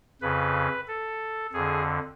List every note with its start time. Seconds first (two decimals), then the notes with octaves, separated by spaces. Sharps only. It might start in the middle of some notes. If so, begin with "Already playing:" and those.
0.22 F2 C#3 B4
0.88 A4
1.53 F2 D3 G#4